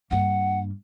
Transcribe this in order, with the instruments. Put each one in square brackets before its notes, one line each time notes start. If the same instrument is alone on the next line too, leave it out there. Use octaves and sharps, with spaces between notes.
[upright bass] G2 A#3 [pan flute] F#5